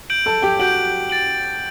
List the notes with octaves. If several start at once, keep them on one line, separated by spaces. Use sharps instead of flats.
G6 D7 F#7
A4 A5
G4 G5
F#4 F#5 G6 D7 F#7
A6 D7 F#7